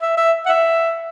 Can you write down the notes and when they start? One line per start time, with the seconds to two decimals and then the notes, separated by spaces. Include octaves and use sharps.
0.02 E5
0.17 E5
0.46 F#5
0.49 E5